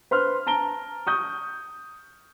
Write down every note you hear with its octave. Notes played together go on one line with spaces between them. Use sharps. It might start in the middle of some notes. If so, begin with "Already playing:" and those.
B4 C5 C6 F6
A5 A#5 D7 G7
C#6 D#6 G6